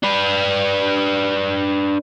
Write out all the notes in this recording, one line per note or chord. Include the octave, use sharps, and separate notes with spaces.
D4 B4